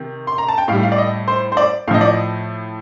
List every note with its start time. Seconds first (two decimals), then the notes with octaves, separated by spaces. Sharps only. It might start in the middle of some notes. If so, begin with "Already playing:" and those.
Already playing: C3 D#3
0.27 C6
0.38 A#5
0.49 A5
0.58 G5
0.68 A2 F5
0.72 G3
0.83 F5
0.92 D5
0.98 D#5
1.28 C5
1.52 C5
1.57 D5
1.88 A2 F5
1.91 F3 D#5
2.01 D5
2.08 D#5